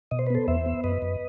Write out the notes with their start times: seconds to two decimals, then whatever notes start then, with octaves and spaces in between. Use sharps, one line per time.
0.11 B2 D#5
0.19 C5
0.27 B4
0.30 B3 A4 C5
0.48 E2 C5 E5
0.66 B3
0.84 F#2 B4 D#5
1.02 F#2